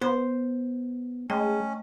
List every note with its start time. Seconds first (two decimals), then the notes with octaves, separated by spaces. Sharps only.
0.01 B3 C5
1.30 G#3 A3 C#4 D#5 G5